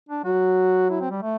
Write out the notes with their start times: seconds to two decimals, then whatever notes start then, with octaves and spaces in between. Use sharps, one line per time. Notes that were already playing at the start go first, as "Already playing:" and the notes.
0.09 D4
0.25 F#3 F#4
0.90 E4
1.01 C4
1.11 G3
1.23 A3